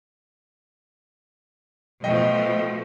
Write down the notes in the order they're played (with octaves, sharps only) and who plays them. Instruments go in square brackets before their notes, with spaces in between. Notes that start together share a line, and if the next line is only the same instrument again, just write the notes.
[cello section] B2 F3 A3 [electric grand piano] D#5 G5